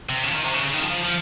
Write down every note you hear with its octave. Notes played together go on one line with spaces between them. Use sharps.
C3
C#3
F3
D#3
C3
C#3
C#3
D#3
F3
F3